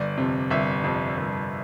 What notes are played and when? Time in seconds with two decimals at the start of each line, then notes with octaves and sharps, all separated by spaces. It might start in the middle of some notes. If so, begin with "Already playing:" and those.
Already playing: G1 D5
0.18 F2 C3
0.50 G1 E5
0.84 F2 C3
1.17 G1